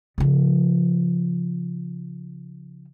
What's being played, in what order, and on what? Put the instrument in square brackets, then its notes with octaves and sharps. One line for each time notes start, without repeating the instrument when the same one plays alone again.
[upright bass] C#3 F3